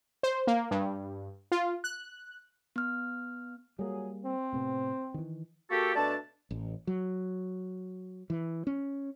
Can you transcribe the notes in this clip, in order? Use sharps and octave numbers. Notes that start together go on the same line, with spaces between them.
C5
A#3
G2
F4
F#6
B3 F6
F#3 G3 A#3 G#4
C4
A2 C3 B3
D#3 E3
A#3 F#4 G4 A4
B2 A3 D4 D5 A5
A1
F#3
E3
C#4